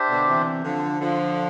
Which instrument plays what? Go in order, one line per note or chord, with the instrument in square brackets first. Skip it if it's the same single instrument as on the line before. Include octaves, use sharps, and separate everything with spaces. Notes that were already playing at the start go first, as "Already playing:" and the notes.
Already playing: [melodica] D4 G4 C5 E5
[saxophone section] B2 D3
C3 E3
D3 F3
D3 F3